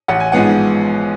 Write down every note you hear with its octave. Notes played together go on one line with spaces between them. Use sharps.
A1 F#5
G#5
G#2 F3 G#3 B3 F#5